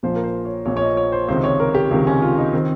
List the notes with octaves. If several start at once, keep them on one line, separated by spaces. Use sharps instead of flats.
A#1 A#2 F3 C5
A#4
C5
C#5
A#1 A#2 F3 C#5
C#5
D#5
C#5
C5
C#2 C3 D#3 C5
C#5
A#4
G4
C#2 C3 D#3
C#4
F4
D#4
D#3 C4